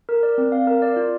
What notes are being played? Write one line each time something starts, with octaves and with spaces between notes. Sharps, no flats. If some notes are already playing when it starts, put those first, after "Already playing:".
A#4
D5
C4
F5
A#4
D5
F4